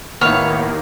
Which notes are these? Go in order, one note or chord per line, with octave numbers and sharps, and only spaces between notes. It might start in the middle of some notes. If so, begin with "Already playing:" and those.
D#2 A2 D#3 A#3 B3 C#5 F5 F6